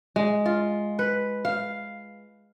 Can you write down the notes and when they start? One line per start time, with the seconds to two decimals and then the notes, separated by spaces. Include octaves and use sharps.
0.16 G#3
0.46 F4
0.99 B4
1.45 F5